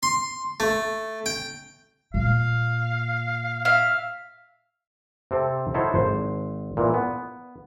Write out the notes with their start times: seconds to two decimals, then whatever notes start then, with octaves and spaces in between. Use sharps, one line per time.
0.03 C6
0.60 A3
1.26 G5
2.14 A#2 F5
3.65 E5 F5
5.31 C3 C4 A4
5.74 D#4 E4 F#4 A4 C5 C#5
5.95 G#1 C5
6.77 A#2 E3
6.94 B3